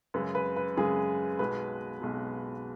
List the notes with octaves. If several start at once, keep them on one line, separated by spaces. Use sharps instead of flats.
F#2 C#3 G#3 B4
B4
B4
F#2 C#3 G#3 G#4
B1 B2 G#3 B4
B1 B2 G#3